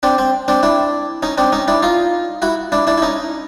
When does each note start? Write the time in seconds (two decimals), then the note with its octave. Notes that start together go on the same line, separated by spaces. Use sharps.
0.03 C4 D4
0.18 C4
0.48 C4 D4
0.63 D4 E4
1.23 C#4 D#4
1.38 C4 D4
1.52 C#4 D#4
1.68 D4 E4
1.82 D#4 F4
2.42 E4 F#4
2.72 D4 E4
2.87 D4 E4
2.98 E4
3.02 C#4 D#4